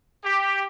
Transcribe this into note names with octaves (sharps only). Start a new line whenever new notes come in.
G4